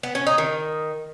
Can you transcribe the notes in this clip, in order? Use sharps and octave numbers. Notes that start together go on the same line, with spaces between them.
B3
C#4
D#4
D#3